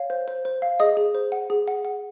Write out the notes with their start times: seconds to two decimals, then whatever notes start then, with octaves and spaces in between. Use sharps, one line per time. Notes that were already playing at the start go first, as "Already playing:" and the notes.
Already playing: C#5 F5
0.10 C5
0.28 C5
0.45 C5
0.62 F5
0.80 G#4 D#5 D#6
0.97 G#4
1.15 C5
1.32 F#5
1.50 G#4
1.68 F#5
1.85 F#5